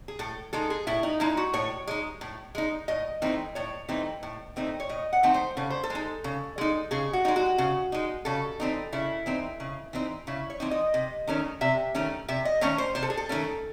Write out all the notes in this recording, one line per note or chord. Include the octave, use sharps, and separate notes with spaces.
G#4
A2 A4
G#3 D#4 A4
G#4
A2 E4
D#4
G#3 D#4 E4
F#4
A2 C#5
G#3 D#4
A2
G#3 D#4
A2 D#5
E3 A3 C4 D#4
A2 C#5
E3 A3 C4 D#4
A2
E3 A3 C4 D#4
C#5
A2 D#5
F#5
E3 A3 C4 D#4
C5
C#3 A4
C5
A4
G#3 D#4
C#3
G#3 D#4
C#3 G#4
F#4
G#3 D#4
F#4
C#3
G#3 D#4
C#3 A4
E3 C4 D#4
C#3 E4
E3 C4 D#4
C#3
E3 C4 D#4
C#3 E4
C#5
E3 C4 D#4
D#5
C3
D#3 A3 C#4
C3 E5
D#3 A3 C#4
C3 E5
D#5
D#3 A3 C#4 C#5
C5
C3 C5
A4
G#4
A4
D#3 A3 C#4